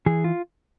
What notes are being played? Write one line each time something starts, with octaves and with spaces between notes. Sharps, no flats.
E3 G#4
F4